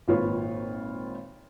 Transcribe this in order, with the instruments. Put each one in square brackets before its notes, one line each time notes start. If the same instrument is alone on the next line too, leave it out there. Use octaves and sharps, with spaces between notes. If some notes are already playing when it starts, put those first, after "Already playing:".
[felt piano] G#1 A#2 F4 B4 C#5